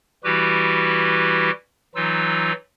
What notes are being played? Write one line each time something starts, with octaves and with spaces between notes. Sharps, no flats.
E3 G3 E4 F#4 G4 B4
E3 F#3 D#4 F4 E6